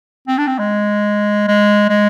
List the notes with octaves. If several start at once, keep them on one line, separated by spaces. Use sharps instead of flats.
C4
D4
C4
G#3
G#3
G#3